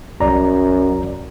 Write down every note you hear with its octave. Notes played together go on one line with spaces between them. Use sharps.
C2 F#2 D5 A#5